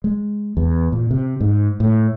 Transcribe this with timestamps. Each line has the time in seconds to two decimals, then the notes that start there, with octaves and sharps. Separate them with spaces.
0.04 G#3
0.57 E2
0.92 A#2
1.11 C3
1.41 G#2
1.80 A2